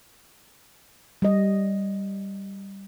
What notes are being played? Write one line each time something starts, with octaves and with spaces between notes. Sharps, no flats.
G3 D#5